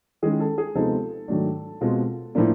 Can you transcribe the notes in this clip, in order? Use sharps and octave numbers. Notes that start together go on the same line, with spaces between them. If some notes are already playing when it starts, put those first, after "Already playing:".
D#3 G#3 C#4 E4 G#4
A4
G#4
C3 F3 G#3 B3 D#4 A4
G#2 D#3 F#3 A3 D4
B2 G#3 C4 F4
A2 F3 A#3 D4